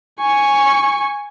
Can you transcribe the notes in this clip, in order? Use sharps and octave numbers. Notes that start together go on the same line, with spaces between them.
G#5 C#6